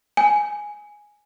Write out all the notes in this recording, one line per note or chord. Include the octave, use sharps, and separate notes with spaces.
G#5